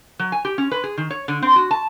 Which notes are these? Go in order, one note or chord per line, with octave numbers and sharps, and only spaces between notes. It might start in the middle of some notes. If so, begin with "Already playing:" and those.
F#3
G#5
G4
C#4
B4
G#4
D#3
C#5
D3
C4
F#4
A5